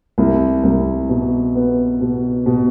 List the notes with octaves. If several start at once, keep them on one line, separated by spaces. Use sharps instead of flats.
C2
C2
B2
B3
B2
B2